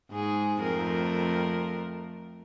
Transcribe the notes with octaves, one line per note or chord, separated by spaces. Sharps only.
G#2 G#4
F2 A3 A#4